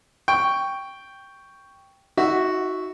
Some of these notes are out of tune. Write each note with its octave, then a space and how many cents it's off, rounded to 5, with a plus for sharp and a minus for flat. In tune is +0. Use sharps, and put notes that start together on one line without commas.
G5 +0 C#6 +5
D#4 +35 F#4 +0 E5 +0